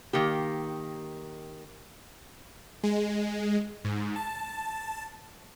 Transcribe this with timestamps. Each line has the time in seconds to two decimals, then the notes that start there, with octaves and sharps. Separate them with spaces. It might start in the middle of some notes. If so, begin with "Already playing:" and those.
0.13 D#3 A#3 G4
2.83 G#3
3.85 G#2
4.16 A5